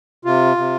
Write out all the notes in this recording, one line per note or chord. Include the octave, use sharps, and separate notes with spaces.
C3 F4
C3